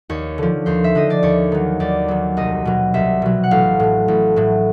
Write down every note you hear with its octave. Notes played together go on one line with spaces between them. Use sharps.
D#2 C#5
D3 F3
D#2 C5
E5
D3 F3 D#5
D5
D#2 C#5
D#3 F#3
D#2 D5
D#3 F#3
C2 D#5
B2 F#3
C2 E5
B2 F#3
F#5
A1 F5
A2 F#3
A1
A2 F#3